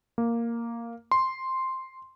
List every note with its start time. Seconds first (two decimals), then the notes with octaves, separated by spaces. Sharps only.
0.18 A#3
1.11 C6